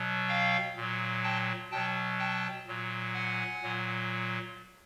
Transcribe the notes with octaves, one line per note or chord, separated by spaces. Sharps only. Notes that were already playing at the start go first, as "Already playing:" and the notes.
Already playing: B2 F#3
F5 G5
A#2 F#3
G5 A5
B2 F#3 G5 A5
G5 A5
A#2 F#3
F#5 G#5
A#2 F#3